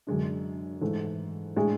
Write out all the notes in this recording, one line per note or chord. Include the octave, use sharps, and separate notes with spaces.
F#2 D3 G#3 D4
G#2 E3 A3
A2 G#3 D4 G#4